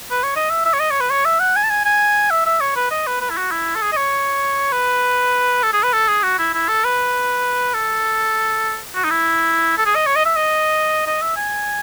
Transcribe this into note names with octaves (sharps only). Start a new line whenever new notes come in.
B4
C#5
D#5
E5
E5
C#5
D#5
C#5
B4
C#5
E5
F#5
G#5
A5
G#5
G#5
E5
E5
C#5
B4
D#5
B4
B4
E4
F#4
E4
A4
G#4
D#5
C#5
B4
A4
G#4
B4
A4
G#4
F#4
E4
E4
A4
B4
A4
F#4
D#4
E4
A4
G#4
D#5
C#5
D#5
E5
D#5
D#5
E5
G#5